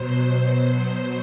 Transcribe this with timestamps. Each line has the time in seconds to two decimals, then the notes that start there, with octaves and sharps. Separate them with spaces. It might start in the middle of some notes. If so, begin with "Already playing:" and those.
Already playing: B2 F#3 C5
0.30 C5